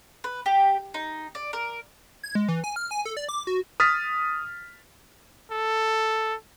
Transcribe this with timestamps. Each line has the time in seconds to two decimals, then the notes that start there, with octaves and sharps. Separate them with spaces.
0.24 B4
0.46 G4
0.94 D#4
1.35 D5
1.53 A#4
2.24 G#6
2.35 G#3
2.48 E3
2.64 G#5
2.76 F6
2.91 G#5
3.05 A4
3.17 D5
3.29 D6
3.47 F#4
3.80 D#6 F6 A6 B6
5.52 A4